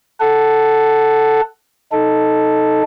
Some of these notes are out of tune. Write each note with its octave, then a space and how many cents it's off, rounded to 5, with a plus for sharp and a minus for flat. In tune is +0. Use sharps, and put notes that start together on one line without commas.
A4 +0 F#5 +10
D#4 +0 A4 +0